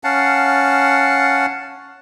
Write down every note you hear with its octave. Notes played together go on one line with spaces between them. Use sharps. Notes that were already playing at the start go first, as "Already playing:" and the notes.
C#4 F5 F#5 A5